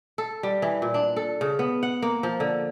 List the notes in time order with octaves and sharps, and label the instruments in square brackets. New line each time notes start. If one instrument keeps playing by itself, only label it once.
[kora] A4
G3
E3
A#2
D4
A4
C#3
B3
F#5
A#3
F3
D3